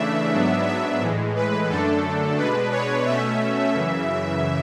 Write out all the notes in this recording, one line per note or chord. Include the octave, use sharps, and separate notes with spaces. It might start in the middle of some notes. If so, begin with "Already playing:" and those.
Already playing: C#3 E3 A3 D4 E5
G#2 F#3 B3 D4
E5
A2 E3 G#3
B4
F#2 D3 A3 D4 A4
B2 G#3 D4 B4
C#5
B2 A3 C#4 E5
F#2 C#3 E3